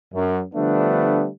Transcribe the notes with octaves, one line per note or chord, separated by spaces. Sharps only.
F#2
D3 F3 G3 A3 B3 D4